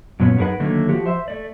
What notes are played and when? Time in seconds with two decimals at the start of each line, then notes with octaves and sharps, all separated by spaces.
0.20 F#2 A#2 B3 C#4
0.38 F#2 D#4 G#4 A#4 B4 F#5
0.60 D3 D#3 F#3 A3 A#3
0.89 F3 F#4 G4
1.06 C5 E5
1.28 A3 D5